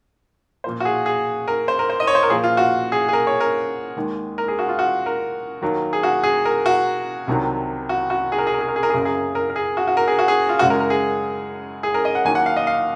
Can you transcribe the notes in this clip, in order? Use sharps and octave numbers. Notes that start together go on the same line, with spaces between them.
A#2 F3 A#3 C5
F#4
G#4
G#4
A#4
C5
A#4
C5
D#5
C#5
C5
A#4
A#2 F3 A#3 G#4
F4
F#4
G#4
G#4
A#4
C#5
A#4
D#2 D#3 G#3
A#4
G#4
F#4
F4
F#4
A#4
D#2 D#3 F#3 A#3
G#4
F#4
G#4
A#4
F#4
C2 C3 D#3 F#3
F#4
F#4
G#4
A#4
G#4
A#4
G#4
A#4
G#4
A#4
G#4
F#2 C#3 F#3 A#3 A#4
G#4
A#4
A#4
G#4
F#4
F#4
A#4
G#4
F#4
G#4
F4
F#2 C#3 G#3 F#4
A#4
A#4
G#4
G#4
A#4
D#5
F#5
D#2 D#3 F#3 A#3 G#5
F#5
F5
D#5
F5